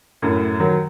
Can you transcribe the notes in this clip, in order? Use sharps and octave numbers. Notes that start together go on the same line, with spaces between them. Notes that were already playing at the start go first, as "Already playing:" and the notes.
F#2 A2
D#3 F#3